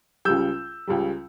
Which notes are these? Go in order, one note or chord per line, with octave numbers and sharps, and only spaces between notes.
C#2 C#3 G3 E6 G6
C#2 C#3 G3